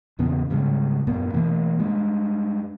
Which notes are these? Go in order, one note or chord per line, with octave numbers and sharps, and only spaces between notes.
E2 A#2 C#3 B3
G#2 C#3 G3 G#3
F#2 A#2 A#3 B3
B2 E3 A3 A#3
G2 G#3